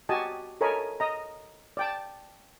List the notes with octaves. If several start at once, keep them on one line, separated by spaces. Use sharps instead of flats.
F#4 G4 D#5 G#5 A5
A4 A#4 C#5 D#5 G#5 B5
D#5 A#5
D5 G5 A5